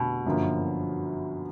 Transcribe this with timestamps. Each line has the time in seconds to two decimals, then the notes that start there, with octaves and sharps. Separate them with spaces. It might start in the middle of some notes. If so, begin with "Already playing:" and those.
Already playing: F1 B2 D3
0.25 G1 F#2 D3 F3 A#3